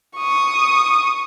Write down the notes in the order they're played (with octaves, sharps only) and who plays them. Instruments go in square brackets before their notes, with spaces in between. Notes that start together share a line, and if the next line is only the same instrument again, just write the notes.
[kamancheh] C#6 D#6